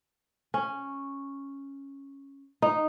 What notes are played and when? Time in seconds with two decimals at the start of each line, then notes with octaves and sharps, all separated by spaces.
0.54 C#4
2.62 D#4